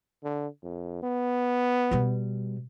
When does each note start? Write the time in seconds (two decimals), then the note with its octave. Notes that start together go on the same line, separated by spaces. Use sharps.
0.24 D3
0.63 F2
1.03 B3
1.91 B2 G3